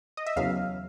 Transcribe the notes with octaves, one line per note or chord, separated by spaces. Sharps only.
D#5
E5
E2 C#3 F#3 F5